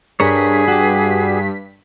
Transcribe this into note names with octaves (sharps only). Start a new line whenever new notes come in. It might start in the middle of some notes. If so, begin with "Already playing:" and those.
G2 D4 G#4 A#4 C#5 B6
F#4 G4